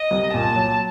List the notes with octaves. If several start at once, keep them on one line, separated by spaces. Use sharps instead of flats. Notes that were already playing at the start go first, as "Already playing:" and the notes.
Already playing: D#5
C2
A#2 A5
F#3